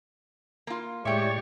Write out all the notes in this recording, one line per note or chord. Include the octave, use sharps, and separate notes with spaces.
A#3 F4
A2 G#3 G4 C#5 D5 E5 G5 C#6